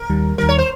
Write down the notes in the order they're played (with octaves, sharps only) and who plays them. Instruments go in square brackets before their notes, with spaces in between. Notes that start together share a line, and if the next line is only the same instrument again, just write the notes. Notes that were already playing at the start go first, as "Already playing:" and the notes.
Already playing: [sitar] A#4
[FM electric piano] D#2 D#3 G3
[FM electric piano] D#2 D#3 G3 [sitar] A#4
[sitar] C#5
C5